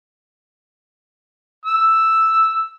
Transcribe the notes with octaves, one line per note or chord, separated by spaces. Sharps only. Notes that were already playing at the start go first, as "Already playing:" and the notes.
E6